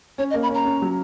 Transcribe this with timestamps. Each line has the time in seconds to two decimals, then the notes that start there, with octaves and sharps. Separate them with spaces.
0.18 C#4 C#5
0.30 D#5
0.34 A#3
0.43 B5
0.49 C#4
0.55 A#5
0.65 C#4
0.82 F#3